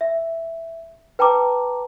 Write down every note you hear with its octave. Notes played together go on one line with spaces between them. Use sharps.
E5
B4 G5 A5 A#5 D6